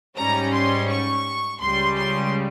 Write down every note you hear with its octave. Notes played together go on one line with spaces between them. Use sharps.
G#2 G3 C#4 A#5
C6
C#6
C#2 C#3 G3 C6
C6